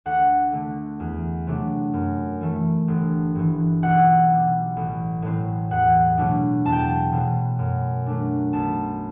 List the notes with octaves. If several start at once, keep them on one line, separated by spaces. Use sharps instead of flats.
D2 F#5
D3 A3
E2
C3 F#3 A3 D4
F#2
E3 A3
G1
G2 E3
B1 F#5
B2 G3
A1
A2 F#3 C4
E2 F#5
B2 F#3 A3 D4
E2 A5
G5
A5
B2 F#3 A3 C4
F#2
F#3 A3 D4
B1 A5